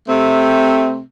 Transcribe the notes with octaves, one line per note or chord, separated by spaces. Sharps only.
C3 A3 C4